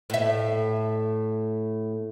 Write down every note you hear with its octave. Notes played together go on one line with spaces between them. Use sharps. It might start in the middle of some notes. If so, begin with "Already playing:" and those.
A2 E5